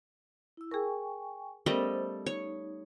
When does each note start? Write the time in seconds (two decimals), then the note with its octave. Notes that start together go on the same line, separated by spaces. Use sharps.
0.57 E4 E6
0.71 G#4 A#4 G5 G#5 C#6
1.66 G3 A3 B3 C#4 A#4 C5 D#5
2.26 D#4 C#5